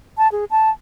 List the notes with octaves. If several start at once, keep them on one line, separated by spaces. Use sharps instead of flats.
A5
G#4
A5